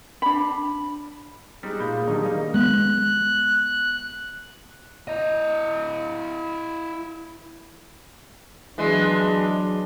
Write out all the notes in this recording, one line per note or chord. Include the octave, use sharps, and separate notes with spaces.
D4 B5
G3 G#3 D#4 G#4
A#2 F5 B5 G6
D#3 F#3 G3 D4 D#4
G3 A#3 D#5
G#3 B3 F#6
E4 D#5
E3 F#3 G#3 B3 D4